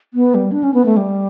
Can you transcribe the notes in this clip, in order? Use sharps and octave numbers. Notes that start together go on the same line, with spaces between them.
B3
G3
D4
C#4
B3
A3
G3